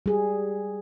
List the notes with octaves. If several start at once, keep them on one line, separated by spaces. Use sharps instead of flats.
G3 G#4